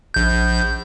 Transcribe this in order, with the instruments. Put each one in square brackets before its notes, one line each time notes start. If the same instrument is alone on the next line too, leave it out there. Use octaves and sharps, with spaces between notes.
[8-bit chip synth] A#1 G6